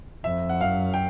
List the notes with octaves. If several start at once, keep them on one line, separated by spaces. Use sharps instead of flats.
F2 E5
F#5
F#2 F5
G5